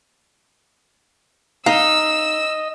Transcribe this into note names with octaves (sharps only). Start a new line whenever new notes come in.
D#4 D#5 F5 E6